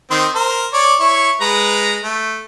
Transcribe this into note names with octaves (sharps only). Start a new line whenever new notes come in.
D#3 C4 C6
A#4 C5
C#5 D5
E4 C#5 C#6
G#3 B4 A#5
A3